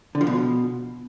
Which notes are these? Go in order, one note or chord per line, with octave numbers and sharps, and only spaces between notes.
D3
F3
B2